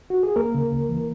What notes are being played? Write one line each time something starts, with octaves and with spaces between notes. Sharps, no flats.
F#4
G#4
C#2 A#3 A#4
C#3
C#2
E3